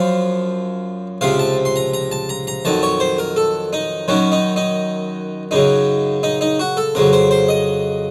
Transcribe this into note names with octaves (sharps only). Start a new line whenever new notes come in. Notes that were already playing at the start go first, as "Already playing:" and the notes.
Already playing: F#2 F3 F5
C#2 C3 F3 F5
A5
C6
A#5
A#5
A5
A#5
A#5
F2 D#3 F#3 A5
C#5
C5
A#4
A4
D#4
F#2 D#3 F#3 C#4
D#4
D#4
F#2 C#3 F#3 D#4
D#4
D#4
F#4
A4
F2 C#3 F#3 A#4
C5
C5
D#5